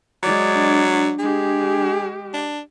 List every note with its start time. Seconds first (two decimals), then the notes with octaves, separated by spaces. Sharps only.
0.23 F#3 G#3 D5
0.55 D4
1.19 G#3 G4 G#4
2.34 D4